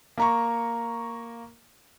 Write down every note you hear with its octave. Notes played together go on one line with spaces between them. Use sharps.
A#3 A#5 C#6